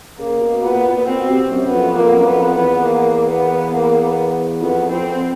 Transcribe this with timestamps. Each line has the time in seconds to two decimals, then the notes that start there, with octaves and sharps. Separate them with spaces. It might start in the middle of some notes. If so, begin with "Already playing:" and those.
0.19 C#3 A#3
0.42 B2
0.63 A#2 B3
0.86 A#2
0.97 A#2
1.07 B2 C4
1.30 C3
1.51 F#2
1.66 B3
1.74 F2
1.96 F2 A#3
2.16 F#2
2.26 F2 B3
2.55 E2 B3
2.85 A#3
3.29 B3
3.73 A#3
4.03 B3
4.62 F2 B3
4.91 F2 C4